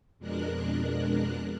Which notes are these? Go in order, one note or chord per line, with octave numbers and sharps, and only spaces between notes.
F2 B2 G#3 D4 A#4 F#6